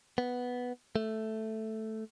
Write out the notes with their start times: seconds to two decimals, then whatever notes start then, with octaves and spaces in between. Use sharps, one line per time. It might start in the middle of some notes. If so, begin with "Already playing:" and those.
0.18 B3
0.96 A3